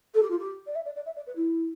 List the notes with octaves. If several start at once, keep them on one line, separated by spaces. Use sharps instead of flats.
A4
G4
F4
G4
D5
E5
D5
D5
E5
D5
B4
E4